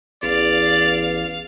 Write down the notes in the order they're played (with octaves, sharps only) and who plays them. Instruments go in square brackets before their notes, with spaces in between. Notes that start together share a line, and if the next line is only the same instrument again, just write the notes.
[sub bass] A1 [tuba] E2 [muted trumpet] D5 [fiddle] F5